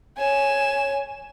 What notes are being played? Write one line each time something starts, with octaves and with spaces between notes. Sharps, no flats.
C#5 G#5 E7